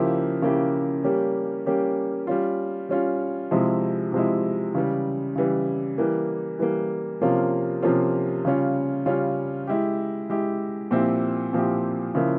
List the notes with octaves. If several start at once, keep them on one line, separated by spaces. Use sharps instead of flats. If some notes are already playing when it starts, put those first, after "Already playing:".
Already playing: C#3 F3 A#3 E4 G4
C#3 F3 A#3 E4 G4
G3 A#3 C#4 G4
G3 A#3 C#4 G4
G3 C#4 F4
G3 C#4 F4
C3 F3 G#3 E4
C3 F3 G#3 E4
C#3 E3 G3
C#3 E3 G3
E3 G3 A#3
E3 G3 A#3
C3 F3 A#3 C#4 F4
C3 F3 A#3 C#4 F4
C#3 G3 C#4 F4
C#3 G3 C#4 F4
G#3 E4 G4
G#3 E4 G4
A#2 F3 C4 E4 G4
A#2 F3 C4 E4 G4
C#3 F3 A#3 E4